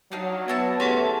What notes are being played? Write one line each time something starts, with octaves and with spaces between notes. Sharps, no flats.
F#3 D4 D#4 F5
B3 E4 F#4 A5
A2 A3 C#4 G4 G#4 F#5 A5